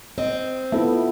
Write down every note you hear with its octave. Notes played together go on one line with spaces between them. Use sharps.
C4 D#5
B3 E4 F4 A4 E5